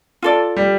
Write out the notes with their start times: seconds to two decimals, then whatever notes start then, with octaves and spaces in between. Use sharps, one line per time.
0.22 F4 A4 D5
0.56 G3